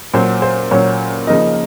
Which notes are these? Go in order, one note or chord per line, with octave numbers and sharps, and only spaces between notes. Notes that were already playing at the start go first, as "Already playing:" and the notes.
A#2 F#3 C#4 C5
C5
A#2 F#3 C#4 C#5
C#3 F3 A#3 D#4 D#5